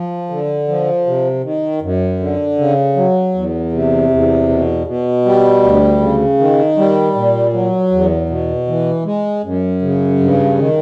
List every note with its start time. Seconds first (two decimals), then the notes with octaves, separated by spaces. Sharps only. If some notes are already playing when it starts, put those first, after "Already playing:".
Already playing: F3
0.30 D3
0.68 F3
1.06 C3
1.44 D#3
1.82 F#2
2.20 D3
2.58 C#3
2.96 F#3
3.35 E2
3.72 C3
4.10 E2
4.49 B2
4.87 B2
5.25 G3
5.63 D2
6.01 C#3
6.39 D#3
6.78 G3
7.15 A#2
7.53 F#3
7.91 E2
8.29 B2
8.67 E3
9.05 G#3
9.43 F#2
9.82 C#3
10.20 G2
10.58 D#3